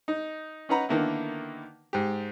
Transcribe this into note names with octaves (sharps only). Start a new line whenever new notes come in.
D#4
C#4 D#4 B4 F#5 A#5 B5
D3 D#3 A#3 B3 E4
G#2 G4